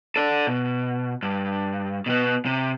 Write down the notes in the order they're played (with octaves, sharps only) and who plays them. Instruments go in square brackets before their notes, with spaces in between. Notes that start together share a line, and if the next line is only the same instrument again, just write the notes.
[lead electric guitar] A4 D5
B2
G2
B2 B3
C3